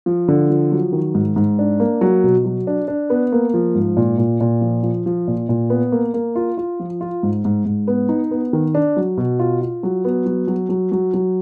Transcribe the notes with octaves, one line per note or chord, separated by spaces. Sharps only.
F3
D3
F3
F#3
D#3
G#2
G#2
D4
A#3
F#3
B2
F#3
D4
D4
B3
A#3
F3
G#2
A#2
A#2
A#2
F3
F3
F3
A#2
A#2
B3
A#3
A#3
F4
F4
F3
F4
G#2
G#2
G#2
B3
D#4
B3
D#3
D4
F#3
B2
F4
F4
F#3
B3
F#3
F#3
F#3
F#3
F#3